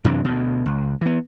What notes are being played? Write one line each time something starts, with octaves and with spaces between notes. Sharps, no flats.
F#2 C3 E3 D4
D2 B2
C#2
E3 B3